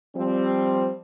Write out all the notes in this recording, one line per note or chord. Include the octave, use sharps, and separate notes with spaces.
F3 G3 C4